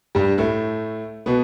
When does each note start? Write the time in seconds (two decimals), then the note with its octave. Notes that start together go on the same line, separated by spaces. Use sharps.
0.15 G2 G3
0.38 A2 A3
1.26 B2 B3